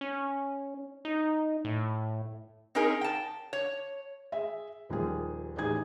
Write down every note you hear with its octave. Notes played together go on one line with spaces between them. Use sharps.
C#4
D#4
A2
C4 C#4 D#4 G#4 A#4
G5 A5
C#5
G#4 E5
D#1 D#2 F3 G3 G#4
A1 D#4 G4 G#4 G#6